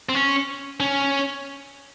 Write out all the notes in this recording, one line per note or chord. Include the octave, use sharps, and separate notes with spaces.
C4
C#4
C#4